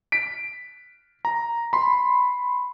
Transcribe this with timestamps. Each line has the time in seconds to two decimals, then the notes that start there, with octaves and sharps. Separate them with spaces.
0.12 B6 D7
1.25 A#5
1.73 B5 C6